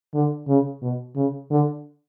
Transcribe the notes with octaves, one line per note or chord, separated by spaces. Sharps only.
D3
C#3
B2
C#3
D3